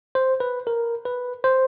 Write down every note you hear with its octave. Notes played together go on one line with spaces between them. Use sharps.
C5
B4
A#4
B4
C5